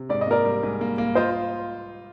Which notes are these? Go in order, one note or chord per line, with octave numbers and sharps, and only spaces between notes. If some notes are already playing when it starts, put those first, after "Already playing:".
Already playing: C3
G#2 D5
D#5
A#3 A#4 D5
G3
G#2
A#3
A#3
F4 C5 D#5